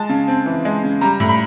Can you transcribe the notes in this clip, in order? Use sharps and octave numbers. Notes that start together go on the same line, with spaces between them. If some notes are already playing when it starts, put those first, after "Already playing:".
Already playing: G#3 A5
C#3
C4
E3
G#3
C#3
G3 A#5
A2
B5